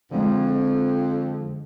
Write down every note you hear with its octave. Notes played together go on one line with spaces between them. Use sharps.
F2 D3 F3 G#3